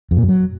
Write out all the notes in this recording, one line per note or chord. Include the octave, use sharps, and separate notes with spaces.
F2
A#2
F#2
F#3